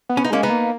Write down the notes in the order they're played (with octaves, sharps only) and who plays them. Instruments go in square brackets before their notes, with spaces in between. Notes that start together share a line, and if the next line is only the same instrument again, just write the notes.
[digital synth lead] B3
[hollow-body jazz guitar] C#4
D#4
[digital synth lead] G#3 [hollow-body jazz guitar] A#3 C#4
[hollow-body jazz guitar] B3 D#4
[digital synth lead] A#3